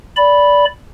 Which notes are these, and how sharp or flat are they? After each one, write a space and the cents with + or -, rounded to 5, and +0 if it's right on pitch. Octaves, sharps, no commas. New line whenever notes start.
D5 -15 B5 -5